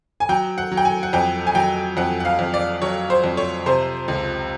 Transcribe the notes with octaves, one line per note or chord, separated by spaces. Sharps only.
G#5
F#3 G5
F#5
F#3
G5
G#5
F#5
F2 G5
G#5
F#3 G5
F2 F#5
F#5
F5
F2
D5
F#3 C#5
C5
F2
C#5
C3 C5
C#2